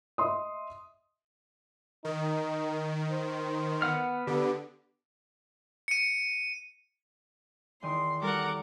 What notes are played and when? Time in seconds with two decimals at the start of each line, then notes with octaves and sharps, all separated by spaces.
0.18 D#5 E5 C6 D#6
2.05 D#3 D#4
3.10 C5
3.82 B3 F#5 F6
4.27 D3 B3 G4
5.88 C#7 D#7
7.82 E2 D#3 C6 D#6
8.22 G3 A4 A#4 F#5 A#5 D6